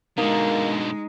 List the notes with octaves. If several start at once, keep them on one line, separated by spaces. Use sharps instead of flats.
B2 D3 G#3 A#3 D#4